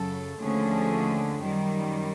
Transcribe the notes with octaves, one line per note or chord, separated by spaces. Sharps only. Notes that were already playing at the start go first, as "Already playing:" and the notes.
Already playing: F#2 C#3 F#3 A4
D#2 D3 F3 A3 C#4 G#4
F#2 D#3 G3